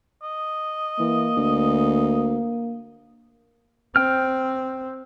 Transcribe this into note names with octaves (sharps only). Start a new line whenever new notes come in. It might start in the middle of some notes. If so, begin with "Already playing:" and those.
D#5
E3 A#3
D2
C4 G5 F6